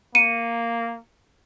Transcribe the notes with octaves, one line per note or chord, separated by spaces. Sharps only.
A#3 C#7 D#7